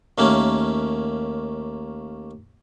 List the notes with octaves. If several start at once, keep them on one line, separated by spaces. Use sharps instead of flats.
D#2 A3 A#3 C#4